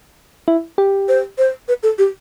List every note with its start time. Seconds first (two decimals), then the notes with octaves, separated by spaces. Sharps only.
0.48 E4
0.78 G4
1.08 C5
1.38 C5
1.68 B4
1.83 A4
1.98 G4